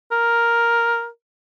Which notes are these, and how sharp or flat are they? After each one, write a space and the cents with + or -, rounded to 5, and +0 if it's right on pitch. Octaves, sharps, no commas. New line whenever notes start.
A#4 +5